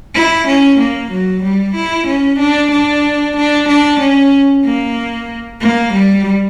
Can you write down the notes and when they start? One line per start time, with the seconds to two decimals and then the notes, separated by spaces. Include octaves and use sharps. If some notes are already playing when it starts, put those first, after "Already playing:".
0.15 E4
0.47 C#4
0.79 A#3
1.11 F#3
1.43 G3
1.75 E4
2.07 C#4
2.39 D4
2.71 D4
3.37 D4
3.69 D4
4.00 C#4
4.65 A#3
5.61 A#3
5.93 G3